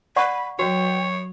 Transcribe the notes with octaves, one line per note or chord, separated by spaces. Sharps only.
D5 F#5 B5 C#6
F#3 F#4 C#5 G5